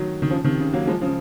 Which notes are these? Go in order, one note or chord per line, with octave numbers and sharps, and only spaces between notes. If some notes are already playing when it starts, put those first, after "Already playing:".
Already playing: D#3 F#3
D#3
C#3 F3
C3 D#3
C#3
F#3 A#3
F3 G#3
C#3 F3